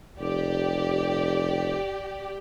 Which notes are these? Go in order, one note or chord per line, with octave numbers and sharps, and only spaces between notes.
F1 G4 D5